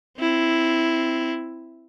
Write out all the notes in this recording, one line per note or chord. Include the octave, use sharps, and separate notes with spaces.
C4 E4